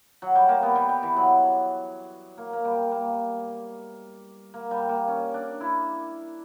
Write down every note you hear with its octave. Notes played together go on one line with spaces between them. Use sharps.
F#3
G3
A#3
B3
G3
G3
E3
F#3
A#3
A#3
G3
A#3
A#3
G3
A#3
C#4
D4
E4